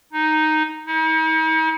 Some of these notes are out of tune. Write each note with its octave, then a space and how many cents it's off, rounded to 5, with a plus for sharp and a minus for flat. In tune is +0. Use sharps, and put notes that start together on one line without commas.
D#4 +0
D#4 +45